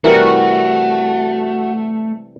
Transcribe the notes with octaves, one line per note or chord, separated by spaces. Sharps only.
C3 E3 G3 A3 E4 F#4 A#4